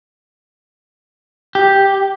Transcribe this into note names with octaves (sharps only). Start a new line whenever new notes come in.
G4